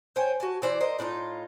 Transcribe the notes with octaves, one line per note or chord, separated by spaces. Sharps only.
C5 C#5 G5 G#5
F#4 G#5 A5
E3 C5 D5
A#4 C5 D#5
A2 D4 D#4 F4